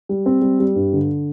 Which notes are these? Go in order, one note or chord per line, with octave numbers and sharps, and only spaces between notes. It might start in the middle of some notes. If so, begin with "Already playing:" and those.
G3
C4
G3
G3
G2
D3